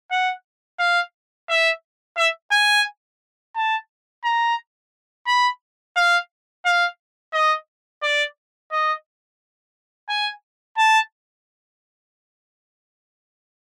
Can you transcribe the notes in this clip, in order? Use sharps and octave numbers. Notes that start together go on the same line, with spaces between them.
F#5
F5
E5
E5
G#5
A5
A#5
B5
F5
F5
D#5
D5
D#5
G#5
A5